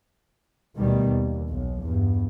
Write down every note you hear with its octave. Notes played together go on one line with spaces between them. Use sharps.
D2 B2 D#3 G3
D#2
B1
E2 G2